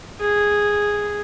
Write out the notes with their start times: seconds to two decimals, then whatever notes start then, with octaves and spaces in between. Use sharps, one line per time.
0.21 G#4